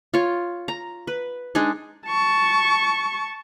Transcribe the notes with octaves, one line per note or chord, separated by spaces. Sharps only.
F4 C#5
A#5
B4
G#3 D4 D#4 G#4
A5 C#6